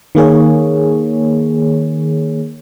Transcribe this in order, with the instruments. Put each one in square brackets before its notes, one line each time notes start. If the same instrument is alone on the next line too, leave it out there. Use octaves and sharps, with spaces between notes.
[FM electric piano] D#3 A#3 G#4 C#5